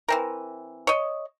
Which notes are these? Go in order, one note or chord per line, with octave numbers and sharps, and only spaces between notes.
E3 C4 A#4
C#5 D#5